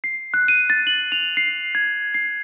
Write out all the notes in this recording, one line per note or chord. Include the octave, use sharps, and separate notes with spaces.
C7
F#6
D#7
A6
F#7
F7
C7
G#6
C7